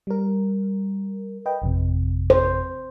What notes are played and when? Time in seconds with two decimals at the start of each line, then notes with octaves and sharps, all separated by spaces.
0.07 G3 A#4
1.46 B4 D#5 G5
1.62 G#1 F2 C3
2.30 C5